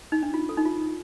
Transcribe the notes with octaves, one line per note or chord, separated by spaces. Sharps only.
D#4
D4
F4
A4
D#4
F4